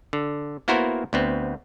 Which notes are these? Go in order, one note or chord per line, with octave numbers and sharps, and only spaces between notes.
D3
A#3 B3 E4 F#4 A#4 C5
D2 B3 C4